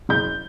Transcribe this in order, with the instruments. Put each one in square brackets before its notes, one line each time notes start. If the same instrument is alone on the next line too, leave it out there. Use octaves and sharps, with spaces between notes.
[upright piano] F#1 G6